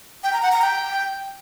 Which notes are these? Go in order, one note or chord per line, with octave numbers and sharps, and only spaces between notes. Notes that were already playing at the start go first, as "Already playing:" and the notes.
G5
A#5
F#5
A#5
G5